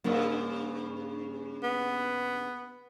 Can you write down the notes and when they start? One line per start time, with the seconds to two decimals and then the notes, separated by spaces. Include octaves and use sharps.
0.04 G2 C#3 A#3 D4 F4
1.63 B3